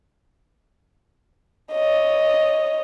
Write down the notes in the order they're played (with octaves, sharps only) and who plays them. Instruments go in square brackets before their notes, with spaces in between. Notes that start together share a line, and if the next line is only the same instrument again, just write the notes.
[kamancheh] C#5 D#5